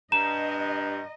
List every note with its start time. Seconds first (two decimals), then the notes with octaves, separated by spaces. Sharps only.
0.12 G2 D#5 A#5 E7